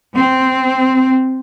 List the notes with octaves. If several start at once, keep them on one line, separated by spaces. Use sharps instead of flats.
C4